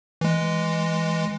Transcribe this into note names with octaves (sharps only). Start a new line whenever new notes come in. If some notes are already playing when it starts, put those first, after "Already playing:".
E3 G#3